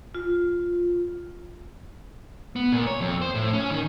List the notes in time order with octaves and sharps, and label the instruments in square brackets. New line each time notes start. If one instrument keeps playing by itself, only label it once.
[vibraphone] F4
[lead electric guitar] B3
A#2
C#5
F2
C5
A2
C#4
D#3